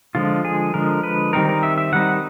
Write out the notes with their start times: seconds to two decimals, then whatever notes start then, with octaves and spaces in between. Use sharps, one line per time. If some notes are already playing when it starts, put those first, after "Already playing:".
0.15 D3 F3 G#3 F4
0.45 G#4
0.74 D3 F3 G#3 A#4
1.03 B4
1.33 D#3 G3 C4 D#4 A#4
1.49 A#4
1.63 E5
1.78 E5
1.92 D#3 G3 C4 D#4 F#5